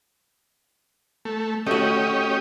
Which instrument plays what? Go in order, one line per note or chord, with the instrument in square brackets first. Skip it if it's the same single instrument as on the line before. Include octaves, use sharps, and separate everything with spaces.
[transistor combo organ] A3
[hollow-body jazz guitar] A3 F#4 [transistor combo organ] C#4 G4 D#5